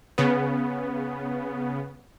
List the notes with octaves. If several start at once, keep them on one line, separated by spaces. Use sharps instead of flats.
C#3 B3